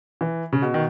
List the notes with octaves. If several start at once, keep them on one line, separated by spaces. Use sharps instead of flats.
E3
C#3
B2
D#3